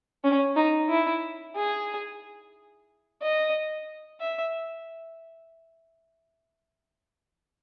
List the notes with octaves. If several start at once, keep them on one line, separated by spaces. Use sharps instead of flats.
C#4
D#4
E4
G#4
D#5
E5